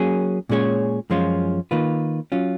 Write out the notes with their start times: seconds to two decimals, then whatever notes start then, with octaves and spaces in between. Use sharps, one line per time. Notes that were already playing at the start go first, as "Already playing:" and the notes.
Already playing: F#3 A#3 C#4 G#4
0.49 A#2 G#3 C#4 G#4 C#5
1.10 F#2 F3 G#3 C#4 F4
1.71 D#3 A#3 F4 B4
2.32 F#3 C#4 F4